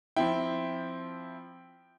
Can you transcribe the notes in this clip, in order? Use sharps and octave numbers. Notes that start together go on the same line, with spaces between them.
F3 C4 E4 G5